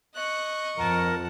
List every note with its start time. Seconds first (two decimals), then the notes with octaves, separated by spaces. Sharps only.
0.15 D#5 C#6 F#6
0.78 F2 A#4 F#5 A5